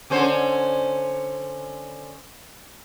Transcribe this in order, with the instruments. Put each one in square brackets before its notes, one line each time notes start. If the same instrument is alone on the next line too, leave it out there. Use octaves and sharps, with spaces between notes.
[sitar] D3 C#4 C5